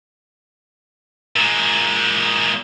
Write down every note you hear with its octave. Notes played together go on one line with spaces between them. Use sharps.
A#2 G#3